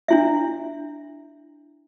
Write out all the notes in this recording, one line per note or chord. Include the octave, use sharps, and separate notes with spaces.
D4 E4 E5